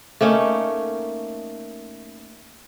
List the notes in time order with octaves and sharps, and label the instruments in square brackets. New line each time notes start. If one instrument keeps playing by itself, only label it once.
[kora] A3 A#3 C#4 D#4